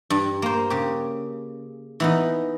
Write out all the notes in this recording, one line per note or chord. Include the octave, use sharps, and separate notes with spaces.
G2
A#3 C5
C#3 G4
E3 B3 D#4